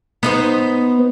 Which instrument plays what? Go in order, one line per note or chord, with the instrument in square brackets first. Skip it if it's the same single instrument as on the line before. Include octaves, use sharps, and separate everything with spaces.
[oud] B3 D#4 C5